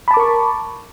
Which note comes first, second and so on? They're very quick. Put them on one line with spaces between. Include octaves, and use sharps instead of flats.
B5 A5 D6 A#4 C#6